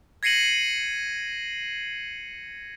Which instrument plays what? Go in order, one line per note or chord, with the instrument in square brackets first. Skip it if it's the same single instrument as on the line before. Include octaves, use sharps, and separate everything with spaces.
[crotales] G#6 A#6 C7 C#7 D#7 F#7